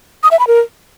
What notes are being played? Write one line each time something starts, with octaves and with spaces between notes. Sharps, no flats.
D#6
E5
B5
A#4